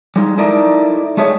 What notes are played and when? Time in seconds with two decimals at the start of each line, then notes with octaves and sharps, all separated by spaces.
0.16 G3 G#3 D#4
0.38 D#4 E4 A4 A#4 D5
1.17 G#3 A3 G#4 C#5